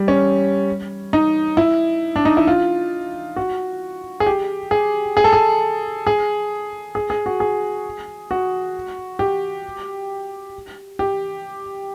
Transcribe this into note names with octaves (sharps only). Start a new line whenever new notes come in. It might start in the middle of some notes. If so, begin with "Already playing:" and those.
Already playing: G3
C#4
D#4
E4
D4
D#4
E4
F4
F#4
G#4
G4
G#4
G#4
A4
G#4
G#4
G#4
G#4
F#4
G#4
F#4
G4
G4